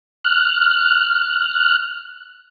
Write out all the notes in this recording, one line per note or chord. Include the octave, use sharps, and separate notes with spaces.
F6 F#6